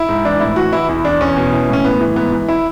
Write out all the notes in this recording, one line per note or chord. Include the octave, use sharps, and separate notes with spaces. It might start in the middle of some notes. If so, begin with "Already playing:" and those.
Already playing: E4
G#2
E3 D4
A2 E4
E3 F#4
E3 E4
E2 E4
E2 D4
E2 C#4
B2
E3
A2 C#4
A2 B3
E3
G#2 B3
E3
E4